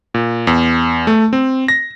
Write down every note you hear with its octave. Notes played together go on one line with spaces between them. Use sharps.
A#2
E2
A3
C4
A#6